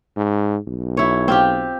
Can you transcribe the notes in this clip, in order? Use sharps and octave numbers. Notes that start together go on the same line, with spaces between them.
G#2
B1
E4 C#5
C4 F4 G4